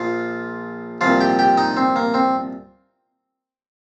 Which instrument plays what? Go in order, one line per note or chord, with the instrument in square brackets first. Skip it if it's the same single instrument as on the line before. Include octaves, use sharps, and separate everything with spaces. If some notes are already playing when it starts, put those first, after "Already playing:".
Already playing: [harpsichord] A#1 A#2 F3 F4 F5
C2 A#2 F3 F4 F5
G4 G5
G4 G5
D#4 D#5
C4
A#3
C4